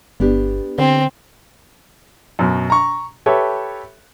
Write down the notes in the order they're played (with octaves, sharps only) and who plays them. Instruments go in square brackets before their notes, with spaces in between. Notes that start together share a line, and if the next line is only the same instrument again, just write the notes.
[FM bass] G1 [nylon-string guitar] B3 D4 G4
[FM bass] D3 [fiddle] C4
[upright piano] F#2 B2
A#5 C#6
G4 A4 B4 C#5 E5